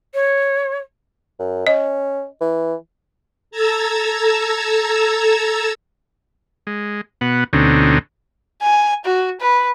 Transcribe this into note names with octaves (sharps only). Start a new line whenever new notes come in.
C#5
F#2
C#4 D#5
E3
A4 A5 A#5 E6 G#6
G#3
B2 B3 F#5
D2 B2 D3 C4 C#4 D#4
G#5
F#4
B4